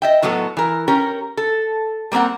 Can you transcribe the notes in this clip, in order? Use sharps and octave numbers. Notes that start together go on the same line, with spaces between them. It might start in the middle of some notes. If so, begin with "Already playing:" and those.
D#5 E5 G5
A2 F#3 B3 F#4 A4
E3 A#4
C#4 G4 A#4
A4
G3 A#3 C4 A#4 F#5